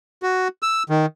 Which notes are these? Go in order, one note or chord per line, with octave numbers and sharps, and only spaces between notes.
F#4
E6
D#3